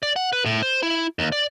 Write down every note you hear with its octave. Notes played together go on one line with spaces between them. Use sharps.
D5
F#5
B4
A2
C5
E4
D#2
D5